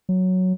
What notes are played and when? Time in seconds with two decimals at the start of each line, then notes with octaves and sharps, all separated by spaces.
0.09 F#3